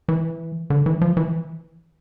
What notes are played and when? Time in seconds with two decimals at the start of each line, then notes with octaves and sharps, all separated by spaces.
0.08 E3
0.70 D3
0.86 E3
1.01 F3
1.17 E3